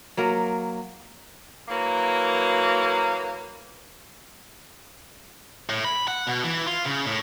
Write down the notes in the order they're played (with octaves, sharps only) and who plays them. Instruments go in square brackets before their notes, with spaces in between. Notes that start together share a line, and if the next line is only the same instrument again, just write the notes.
[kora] F#3 A#3 A#4
[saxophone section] E3 F#3 A#3
[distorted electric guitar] A2
B5
F#5
B2
E3
F4
C#3
A2